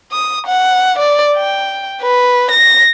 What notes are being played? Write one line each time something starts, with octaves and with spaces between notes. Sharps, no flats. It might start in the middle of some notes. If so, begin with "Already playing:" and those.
D#6
F#5
D5
G5
B4
A#6